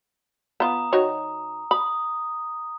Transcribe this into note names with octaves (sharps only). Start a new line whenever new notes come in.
B3 F4 A#5 D#6
D#3 F#4 C#5
B5 D#6